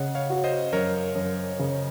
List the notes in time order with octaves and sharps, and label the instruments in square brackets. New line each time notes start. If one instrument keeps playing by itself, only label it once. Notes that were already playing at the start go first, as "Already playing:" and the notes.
Already playing: [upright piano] C#3 [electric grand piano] D#5 F#5
[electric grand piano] C#5 F5
[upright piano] F#4
[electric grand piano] C5 D#5
[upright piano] F#2 [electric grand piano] A#4 C#5
[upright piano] F#2
C#3